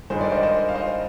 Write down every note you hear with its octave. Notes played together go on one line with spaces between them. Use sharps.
G2 D#3 G#3 G#4 C5
A#4 D5
C5 D#5
C5 D#5
F5
C5 D#5